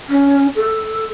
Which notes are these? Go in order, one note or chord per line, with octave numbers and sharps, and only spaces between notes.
C#4
A4